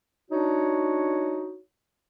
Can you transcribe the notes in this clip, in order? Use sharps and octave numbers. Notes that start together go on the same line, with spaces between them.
D4 D#4 F#4 C#5